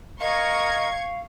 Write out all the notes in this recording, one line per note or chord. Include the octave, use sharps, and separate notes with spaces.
A#4 D#5 F5 C#6 G#6